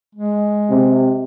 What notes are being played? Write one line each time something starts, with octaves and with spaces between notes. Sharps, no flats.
G#3
C3